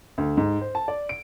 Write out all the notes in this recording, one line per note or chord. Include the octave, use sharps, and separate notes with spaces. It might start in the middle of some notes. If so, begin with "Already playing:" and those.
D2
G#2
C5
A5
D5
D7